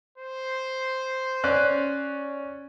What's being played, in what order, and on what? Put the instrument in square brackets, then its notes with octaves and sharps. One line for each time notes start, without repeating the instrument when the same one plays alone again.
[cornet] C5
[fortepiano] C#4 D5 F#6